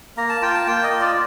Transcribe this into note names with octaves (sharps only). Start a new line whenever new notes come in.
A#3 A#5
A5
F4 G5
A5
A#3 G5
D#5
F4
D5